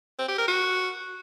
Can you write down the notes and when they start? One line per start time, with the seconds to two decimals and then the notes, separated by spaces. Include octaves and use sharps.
0.19 C4
0.28 G4
0.38 A#4
0.48 F#4